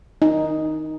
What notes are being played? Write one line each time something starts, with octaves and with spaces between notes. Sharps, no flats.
D#4